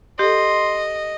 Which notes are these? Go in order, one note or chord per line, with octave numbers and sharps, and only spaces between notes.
G4 A4 D#5 C6